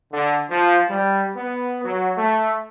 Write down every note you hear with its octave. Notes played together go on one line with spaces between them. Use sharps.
D3
F3
G3
B3
F#3
A3